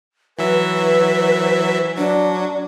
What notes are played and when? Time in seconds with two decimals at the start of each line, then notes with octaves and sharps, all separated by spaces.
0.39 E3 F#3 B4 E5
1.97 F#3 D4